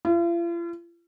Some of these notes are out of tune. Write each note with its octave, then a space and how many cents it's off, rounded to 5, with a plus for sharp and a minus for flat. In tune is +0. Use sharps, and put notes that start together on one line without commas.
F4 -45